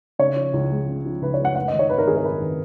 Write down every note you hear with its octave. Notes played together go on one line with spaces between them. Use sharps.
C#3 C#5
F3
C#2
G#3
C#3
F3
C#2 B4
C#5
G#3
F#5
F#2 F#5
D#5
D#3
C#5
G#1 B4
A#4
G#1 G#4
A#4
F#2 B4
D#3